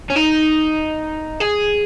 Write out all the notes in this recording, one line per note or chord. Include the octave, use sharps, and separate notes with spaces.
C#4
D#4
G#4